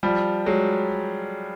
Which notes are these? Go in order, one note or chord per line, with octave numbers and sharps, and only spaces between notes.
F3 G3
F#3 G#3